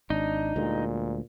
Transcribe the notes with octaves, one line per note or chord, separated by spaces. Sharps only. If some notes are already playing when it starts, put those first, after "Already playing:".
G#1 D4 D#4
D2 A#2 G#3